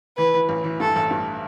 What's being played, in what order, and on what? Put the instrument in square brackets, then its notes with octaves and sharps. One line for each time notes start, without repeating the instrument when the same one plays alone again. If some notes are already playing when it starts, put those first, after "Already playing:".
[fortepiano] E3 [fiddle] B4
[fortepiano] E3
A1
E3
[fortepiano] G2 [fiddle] A4
[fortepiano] A1
G2